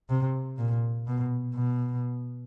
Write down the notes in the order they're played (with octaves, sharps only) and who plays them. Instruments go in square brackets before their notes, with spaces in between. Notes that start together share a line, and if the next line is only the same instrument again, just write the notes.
[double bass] C3
A#2
B2
B2